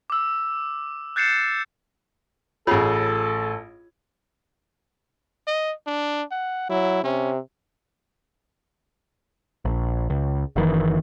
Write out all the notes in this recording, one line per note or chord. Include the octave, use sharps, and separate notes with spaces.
D6 E6
F#6 G6 A6 C7 C#7 E7
A1 F4 G#4 A4 C#5 B5
D#5
D4
F#5
F#3 E4
C3 C#4
A#1
C#2
F#1 D#3 E3